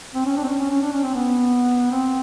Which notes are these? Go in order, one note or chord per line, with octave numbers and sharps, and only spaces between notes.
C4
C#4
D4
C4
C#4
C#4
C#4
D4
C#4
C4
B3
C4